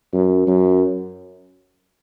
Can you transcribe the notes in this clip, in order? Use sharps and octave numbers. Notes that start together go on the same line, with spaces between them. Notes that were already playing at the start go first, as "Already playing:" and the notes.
F#2
F#2